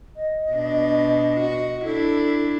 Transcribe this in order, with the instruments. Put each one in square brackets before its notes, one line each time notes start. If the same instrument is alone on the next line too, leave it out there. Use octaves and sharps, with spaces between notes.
[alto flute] D#5
[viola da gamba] B2 D4
F#4
[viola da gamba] D4 E4 [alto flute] A4